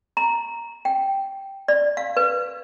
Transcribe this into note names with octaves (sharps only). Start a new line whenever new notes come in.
A#5
G5
D5
F5
B4